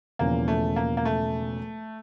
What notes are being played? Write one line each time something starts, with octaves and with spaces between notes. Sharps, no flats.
E1 E2 C#3 F3 A#3
A3
A#3
A#3
A3